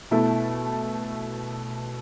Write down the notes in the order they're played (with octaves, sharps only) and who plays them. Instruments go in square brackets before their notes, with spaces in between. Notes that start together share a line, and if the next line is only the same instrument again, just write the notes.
[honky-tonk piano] B2 A3 E4 A4